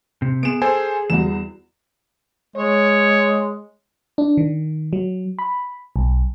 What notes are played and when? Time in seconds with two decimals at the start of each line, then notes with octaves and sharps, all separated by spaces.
0.22 C3
0.43 B3 G#4 D7 E7
0.62 G#4 A4 C5 G#5
1.10 E2 G3 F#4 E7
2.56 G#3 C#5
4.18 D4
4.37 D#3
4.93 F#3
5.39 B5
5.96 B1